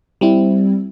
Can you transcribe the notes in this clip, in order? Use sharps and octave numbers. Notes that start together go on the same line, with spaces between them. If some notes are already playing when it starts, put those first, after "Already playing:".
G3 C4 E4